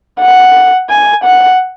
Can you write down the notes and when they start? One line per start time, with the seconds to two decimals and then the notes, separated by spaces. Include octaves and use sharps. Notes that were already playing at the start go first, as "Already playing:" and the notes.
0.20 F#5
0.89 G#5
1.24 F#5